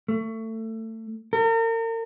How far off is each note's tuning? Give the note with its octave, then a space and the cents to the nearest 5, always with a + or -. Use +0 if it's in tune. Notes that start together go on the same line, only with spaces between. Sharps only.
A3 +25
A#4 -40